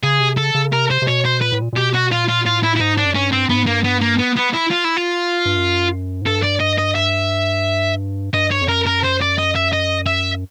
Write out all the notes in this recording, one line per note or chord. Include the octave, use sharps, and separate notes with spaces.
C#3 G#4
C3
C#3 A4
C#3
C3 A#4
C5
C3
B2 C#5
C5
A#2 B4
A2
A#2
A#2
B2 G4
F#4
A#2 F4
F4
A2 F4
E4
E4
G#2 D#4
D4
F#2
G2 C#4
C4
G2 B3
G#2
G2 A#3
B3
A#3
B3
B3
E4
F4
E4
F4
G2
F#2
G#2
G2 A4
D5
D#5
D#5
E5
G2 D#5
C#5
F2
F#2 A#4
A#4
C5
D5
D#5
E5
D#5
E5